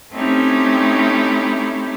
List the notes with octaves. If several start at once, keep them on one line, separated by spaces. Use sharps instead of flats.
A3 C4 C#4 D#4 E4 G4